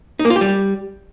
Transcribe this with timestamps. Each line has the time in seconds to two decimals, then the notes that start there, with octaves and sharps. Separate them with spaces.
0.19 D#4
0.25 A#3
0.30 F4
0.36 G4
0.41 G3